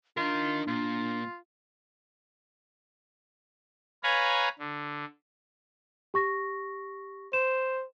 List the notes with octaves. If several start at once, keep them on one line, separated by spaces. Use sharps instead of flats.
D4 D#4 F4 A#4
A#2 F4
B4 C#5 F5 G#5 A#5 B5
D3
G4 C#6 A#6
C5 E7